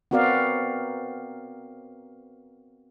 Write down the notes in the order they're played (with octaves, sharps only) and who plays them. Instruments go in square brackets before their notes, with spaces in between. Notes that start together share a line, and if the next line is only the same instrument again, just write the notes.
[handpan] B3 C4 F#4 A#4 D5 F5